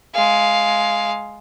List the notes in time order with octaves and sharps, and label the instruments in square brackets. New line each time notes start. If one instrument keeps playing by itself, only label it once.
[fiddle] G#3 F5